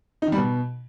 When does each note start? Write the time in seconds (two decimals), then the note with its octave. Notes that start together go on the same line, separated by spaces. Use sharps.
0.22 D#4
0.27 D#3
0.32 G3
0.37 B2